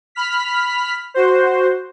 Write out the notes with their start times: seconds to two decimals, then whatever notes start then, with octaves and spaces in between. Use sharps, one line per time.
0.15 B5 F6 B6
1.14 F#4 C5